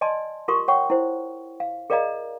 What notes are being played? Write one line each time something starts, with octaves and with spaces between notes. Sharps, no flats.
D5 D#5 G#5 A5 C6
F4 G4 A#4 C6 C#6 D#6
C#5 F#5 G5 C#6
E4 C5
F5
G#4 A#4 D5 D#5 F5 A#5